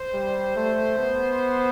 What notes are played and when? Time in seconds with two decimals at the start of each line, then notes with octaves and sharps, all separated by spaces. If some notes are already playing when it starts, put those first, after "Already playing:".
Already playing: C5
0.13 G3
0.56 A3
0.98 B3